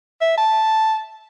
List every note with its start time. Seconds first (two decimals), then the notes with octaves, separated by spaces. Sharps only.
0.21 E5
0.38 A5